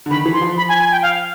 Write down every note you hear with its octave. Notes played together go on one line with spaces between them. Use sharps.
D3
D#3 B5
E3
C6
F3
B5
G#5
G#5
G5
F5